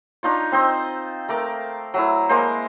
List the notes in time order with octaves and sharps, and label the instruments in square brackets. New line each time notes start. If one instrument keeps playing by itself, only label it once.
[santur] D4 D#4 F4 C#5
C4 C5 D#5
A3 A#4 D6
F#3 A3 E4
G#3 A#3 A#4 C5